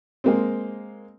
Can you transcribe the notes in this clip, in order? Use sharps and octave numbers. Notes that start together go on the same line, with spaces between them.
G#3 A#3 C4